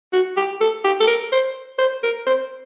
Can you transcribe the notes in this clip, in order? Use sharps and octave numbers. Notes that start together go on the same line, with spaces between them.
F#4
G4
A4
G4
A4
A#4
C5
C5
A#4
C5